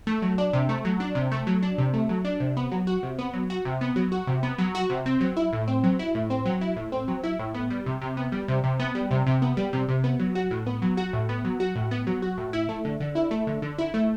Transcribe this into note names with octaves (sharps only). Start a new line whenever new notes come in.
A3
F#3
D4
C3
A3
F#3
D4
C3
A3
F#3
D4
C3
A3
F#3
D4
C3
B3
F#3
F#4
C3
B3
F#3
F#4
C3
B3
F#3
F#4
C3
B3
F#3
F#4
C3
C4
F#3
E4
A2
C4
F#3
E4
A2
C4
F#3
E4
A2
C4
F#3
E4
A2
B3
G3
C3
C3
B3
G3
C3
C3
B3
G3
C3
C3
B3
G3
C3
C3
B3
F#3
F#4
A2
B3
F#3
F#4
A2
B3
F#3
F#4
A2
B3
F#3
F#4
A2
E4
A3
D3
D3
E4
A3
D3
D3
E4
A3